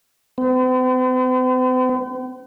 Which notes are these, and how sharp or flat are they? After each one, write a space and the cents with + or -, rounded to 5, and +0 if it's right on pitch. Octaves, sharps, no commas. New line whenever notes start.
C4 -45